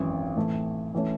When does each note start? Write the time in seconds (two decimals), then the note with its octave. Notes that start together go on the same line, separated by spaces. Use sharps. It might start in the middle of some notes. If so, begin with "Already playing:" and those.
Already playing: G#1 F#2 E3
0.36 A2 E3 A3
0.94 E3 A3 C#4